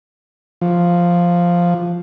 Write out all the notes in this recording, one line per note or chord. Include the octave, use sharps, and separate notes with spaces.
F3